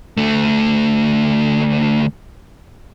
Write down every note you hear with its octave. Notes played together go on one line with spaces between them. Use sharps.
D2 A3